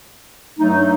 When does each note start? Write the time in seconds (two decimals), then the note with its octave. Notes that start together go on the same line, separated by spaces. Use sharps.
0.59 G2 F#3 A3 D#4